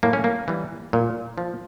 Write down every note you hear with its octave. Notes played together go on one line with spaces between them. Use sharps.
A2 A#3
C#4
A#3
E3 G3
A#2
F3